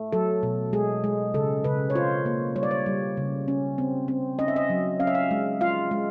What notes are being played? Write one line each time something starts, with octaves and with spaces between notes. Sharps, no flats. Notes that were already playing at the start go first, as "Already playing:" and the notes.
Already playing: A3
F#3 A4
B2
G#3 G#4
G#3
C#3 A4
C#3 B4
C#5
F4 C5
A#3
G3 C#5
D5
C#5
G3
C#3
C#4
C4
C4
C#4 D#5
E5
D#5
F#3
C#4 F5
E5
F5
G#3
F4 F5
G#3